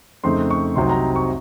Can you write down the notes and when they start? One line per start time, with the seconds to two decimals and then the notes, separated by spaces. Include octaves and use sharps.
0.24 F2 C#3 A3 C4 D#4 C6
0.51 C#6
0.76 C2 C3 F#3 C4 D#4 C6
0.90 A#5
1.16 C#6